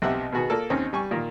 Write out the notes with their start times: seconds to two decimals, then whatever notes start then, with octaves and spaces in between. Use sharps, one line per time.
0.02 B1 C3 G4 E5 F#5 E6
0.32 B2 D#3 B3 F#4 G#4
0.50 A#3 F4 A4 D5
0.70 D#2 C4 C#4 D#4 D#5
0.93 G3 G#5 C#6
1.11 A#2 D#3 A#3